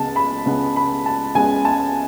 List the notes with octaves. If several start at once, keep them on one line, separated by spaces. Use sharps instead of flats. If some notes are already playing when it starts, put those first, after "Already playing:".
Already playing: C#2 C#3 G#3 B3 A5
B5
C#2 C#3 G#3 B3
B5
A5
C#2 C#3 G#3 B3 G#5
A5